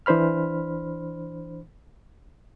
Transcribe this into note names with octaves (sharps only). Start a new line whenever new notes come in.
E3 D4 C5 B5 F6